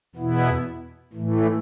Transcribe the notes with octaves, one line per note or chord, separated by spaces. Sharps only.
E2 B2 B3 E4
A2 E3 A3